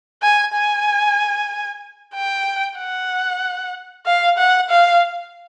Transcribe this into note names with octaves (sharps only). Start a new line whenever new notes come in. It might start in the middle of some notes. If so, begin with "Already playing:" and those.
G#5
G#5
G5
F#5
F5
F#5
F5